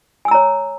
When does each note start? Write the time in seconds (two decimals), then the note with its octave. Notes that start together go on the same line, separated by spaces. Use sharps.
0.25 G#5
0.28 E6
0.31 A#5
0.34 C#5